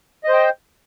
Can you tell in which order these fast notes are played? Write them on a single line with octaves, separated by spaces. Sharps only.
D#5 C5 G5